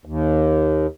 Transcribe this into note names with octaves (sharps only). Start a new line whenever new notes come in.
D#2